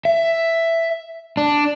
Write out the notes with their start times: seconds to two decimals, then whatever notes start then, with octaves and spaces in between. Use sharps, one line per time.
0.05 E5
1.37 D4